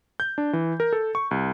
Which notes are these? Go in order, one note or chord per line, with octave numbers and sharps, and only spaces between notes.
G6
D4
E3
A#4
A4
C#6
C2